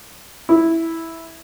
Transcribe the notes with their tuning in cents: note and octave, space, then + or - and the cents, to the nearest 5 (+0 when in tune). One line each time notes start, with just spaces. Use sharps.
E4 -5